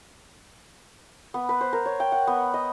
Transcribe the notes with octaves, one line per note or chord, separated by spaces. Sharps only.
B3
B4
C5
A#4
C#5
G5
F#5
B3
D#5